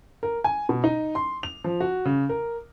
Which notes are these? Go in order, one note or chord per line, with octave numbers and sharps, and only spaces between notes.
A#4
G#5
B2
D#4
C6
F7
F3
F#4
C#3
A#4